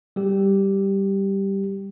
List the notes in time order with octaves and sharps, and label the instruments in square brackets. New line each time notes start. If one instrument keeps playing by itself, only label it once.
[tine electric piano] G3 G4